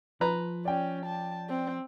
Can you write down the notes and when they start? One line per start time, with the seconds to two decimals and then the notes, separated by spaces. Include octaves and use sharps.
0.21 F3 B4 A#5
0.65 C#4 D5 G5
1.06 A5
1.49 C4